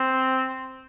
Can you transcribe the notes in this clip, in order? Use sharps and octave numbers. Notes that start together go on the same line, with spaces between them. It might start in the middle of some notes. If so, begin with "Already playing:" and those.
Already playing: C4